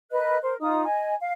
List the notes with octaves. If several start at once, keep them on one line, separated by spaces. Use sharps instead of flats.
A#4 B4 D#5 F#6
A#4 C5
D#4 F4 D#6
D#5 G#5
F5